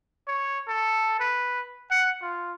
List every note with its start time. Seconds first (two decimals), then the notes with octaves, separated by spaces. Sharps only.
0.28 C#5
0.68 A4
1.20 B4
1.91 F#5
2.22 F4